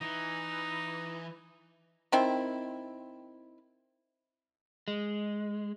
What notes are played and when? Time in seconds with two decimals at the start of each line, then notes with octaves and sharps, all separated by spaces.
0.01 E3 D#4
2.12 D#3 C4 E4
4.88 G#3